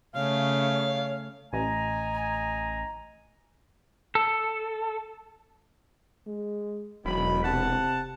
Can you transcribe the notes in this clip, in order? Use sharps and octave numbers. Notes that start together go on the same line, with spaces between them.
C#3 A3 C#5 F5
A1 D#5 G#5 A#5
A4
G#3
E1 D#3 F#3 B5
C3 F#5 A5